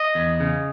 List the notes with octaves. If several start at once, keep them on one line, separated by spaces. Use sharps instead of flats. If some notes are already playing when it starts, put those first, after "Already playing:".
Already playing: D#5
E2
C#3